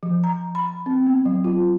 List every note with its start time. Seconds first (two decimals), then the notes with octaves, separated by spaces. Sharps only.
0.03 F3
0.24 A#5
0.55 B5
0.86 C4
1.07 B3
1.25 F#3
1.44 F4